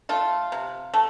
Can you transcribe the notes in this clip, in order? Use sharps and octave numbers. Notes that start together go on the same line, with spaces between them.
A3 F4
C3
A3